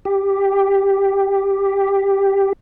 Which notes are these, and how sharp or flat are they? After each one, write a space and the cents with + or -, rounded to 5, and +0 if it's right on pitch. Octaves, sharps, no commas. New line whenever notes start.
G4 +5